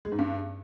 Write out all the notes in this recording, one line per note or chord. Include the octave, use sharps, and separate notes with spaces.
G#3
G#2
G2